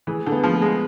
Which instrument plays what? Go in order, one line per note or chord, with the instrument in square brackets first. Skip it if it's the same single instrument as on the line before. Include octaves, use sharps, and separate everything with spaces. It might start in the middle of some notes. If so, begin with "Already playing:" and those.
[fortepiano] E3 [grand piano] G#4
[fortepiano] D3
[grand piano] B3
[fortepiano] F3
[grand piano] G#4
[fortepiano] G#3